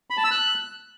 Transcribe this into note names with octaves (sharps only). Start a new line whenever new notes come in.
B5
A5
E6
F#6